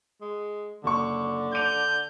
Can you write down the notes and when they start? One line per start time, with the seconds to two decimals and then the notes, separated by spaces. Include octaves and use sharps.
0.22 G#3
0.84 F#1 D3 C#6
1.53 D6 G6 D#7 F7